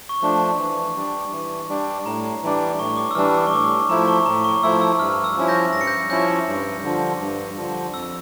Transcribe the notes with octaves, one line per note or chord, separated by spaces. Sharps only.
C#6
F3 A3 D4
E3
G3 D4
E3
G3 D4
A2 A#5
E3 G3 D4
A2 C#6
D6
E6
E3 G3 D4 F6
E6
C#6
A2 D6
F3 A3 E4 A#5
C#6
A2 A#5
C#6
F3 A3 E4 E6
E6
G2 F6
E6
F3 C#4 E4
G6 A#6
G2 A#6
C#7
G6 A#6
F3 C#4 E4 G6
G2
D3 F3
G2
D3 F3
F2 E6